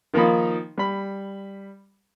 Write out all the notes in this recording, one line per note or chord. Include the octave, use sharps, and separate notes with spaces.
D#3 F3 A#3 D#4 B5
G3 B5